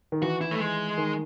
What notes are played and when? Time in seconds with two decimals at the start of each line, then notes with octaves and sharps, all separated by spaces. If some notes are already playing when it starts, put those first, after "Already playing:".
0.12 D#3
0.22 E3 F#4
0.41 E4
0.51 A3
0.59 G#3
0.98 D#3